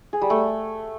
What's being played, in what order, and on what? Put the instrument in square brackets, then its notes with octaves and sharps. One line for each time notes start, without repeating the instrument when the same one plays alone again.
[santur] G#4
G3
A3